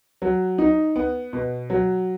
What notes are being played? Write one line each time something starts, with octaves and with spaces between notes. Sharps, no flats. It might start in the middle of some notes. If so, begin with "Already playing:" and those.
F#3
D#4
B3
B2
F#3